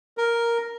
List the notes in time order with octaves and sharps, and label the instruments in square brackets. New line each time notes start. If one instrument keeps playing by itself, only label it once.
[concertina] A#4